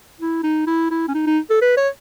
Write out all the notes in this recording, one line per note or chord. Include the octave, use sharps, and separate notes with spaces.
E4
D#4
E4
E4
C#4
D#4
D#4
A4
B4
C#5